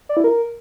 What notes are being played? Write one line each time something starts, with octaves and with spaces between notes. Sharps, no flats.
D5
E4
A#4